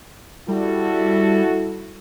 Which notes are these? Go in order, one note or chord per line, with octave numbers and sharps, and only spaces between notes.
G3 E4 F#4 A4